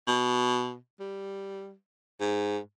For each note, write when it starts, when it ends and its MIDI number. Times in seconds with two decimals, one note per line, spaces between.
0.07 0.76 47
1.00 1.74 55
2.21 2.58 44